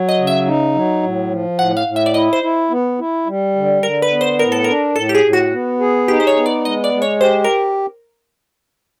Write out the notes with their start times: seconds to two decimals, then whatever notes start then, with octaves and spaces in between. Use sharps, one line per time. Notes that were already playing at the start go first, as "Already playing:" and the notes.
Already playing: F#3
0.09 D#5
0.18 C#3
0.27 E5
0.46 D#4
0.74 F#3
1.03 A2
1.30 F3
1.59 A2 F#5
1.77 F5
1.87 A2
1.96 E5
2.06 D5
2.14 E4 D#5
2.33 C5
2.43 E4
2.70 B3
2.99 E4
3.27 G3
3.56 D3
3.83 D3 A#4
4.02 B4
4.12 B3
4.21 C5
4.39 A2 A#4
4.52 A4
4.64 D4 A#4
4.96 A2 A4
5.09 G4
5.15 G#4
5.25 A2
5.33 F#4
5.52 B3
5.80 G#4
6.08 D#4 G4
6.20 C5
6.27 C#5
6.36 B3
6.46 D5
6.65 G#3 D#5
6.84 D5
6.93 G#3
7.02 C#5
7.20 G4 C5
7.44 A#4